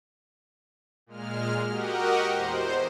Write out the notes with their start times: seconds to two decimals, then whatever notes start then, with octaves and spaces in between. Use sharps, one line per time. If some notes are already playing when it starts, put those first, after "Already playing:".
1.06 A#2 G#3 F6
1.69 F#4 G4 A#4 D#5 F#5
2.33 E2 C5